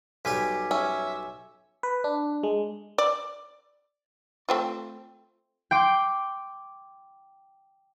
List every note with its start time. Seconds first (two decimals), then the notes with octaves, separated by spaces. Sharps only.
0.25 B1 G3 G4 G#5 G#6 B6
0.71 C#4 E5
1.83 B4
2.04 D4
2.43 G#3
2.98 D5
4.49 A3 C4 F4
5.71 G5 C6 D6